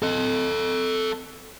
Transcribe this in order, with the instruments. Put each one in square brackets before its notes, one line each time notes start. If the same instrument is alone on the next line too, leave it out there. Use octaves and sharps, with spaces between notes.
[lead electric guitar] A4 D#5